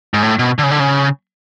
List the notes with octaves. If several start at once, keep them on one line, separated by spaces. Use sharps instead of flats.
G#2
A2
B2
D3
C#3
D3
C#3